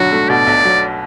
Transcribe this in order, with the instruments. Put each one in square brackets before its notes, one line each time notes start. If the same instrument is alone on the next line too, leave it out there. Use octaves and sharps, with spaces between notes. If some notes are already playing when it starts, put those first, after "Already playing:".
Already playing: [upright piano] B1 D3 F#3 [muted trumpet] F#4
[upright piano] A3
[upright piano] B2 [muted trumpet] D5
[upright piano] B1
F#3